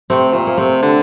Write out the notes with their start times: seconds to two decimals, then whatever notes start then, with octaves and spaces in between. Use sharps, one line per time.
0.10 C3 A3 C4
0.33 A#2 A3 C4
0.47 A#3
0.58 C3 A3 C4
0.82 D3